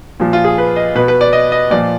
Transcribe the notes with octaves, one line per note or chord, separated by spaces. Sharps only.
A#2 F3
F4
G#4
B4
D#5
B2 B4
B4
D5
D#5
D#5
A#2 F3 D5